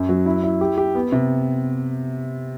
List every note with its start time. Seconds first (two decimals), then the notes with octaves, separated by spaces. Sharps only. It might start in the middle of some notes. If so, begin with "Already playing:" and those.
Already playing: F#2
0.09 F#3
0.26 E4
0.44 E4
0.61 G4
0.78 G4
0.95 B3
1.12 C3